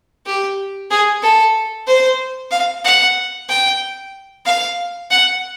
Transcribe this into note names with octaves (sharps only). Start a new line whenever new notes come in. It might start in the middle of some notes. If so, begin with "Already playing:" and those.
G4
G#4
A4
C5
F5
F#5
G5
F5
F#5